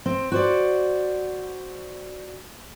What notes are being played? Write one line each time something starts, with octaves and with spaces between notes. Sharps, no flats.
C4
F#4 C5 D5